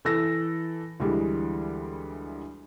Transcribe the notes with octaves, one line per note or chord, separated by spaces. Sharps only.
E3 A4 E6 A#6
D2 E3 G3 G#3